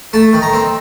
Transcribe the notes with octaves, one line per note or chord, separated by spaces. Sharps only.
A3 A5
D#3
A#5
C4